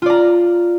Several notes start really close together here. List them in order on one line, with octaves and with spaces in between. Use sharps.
F4 D5 A#5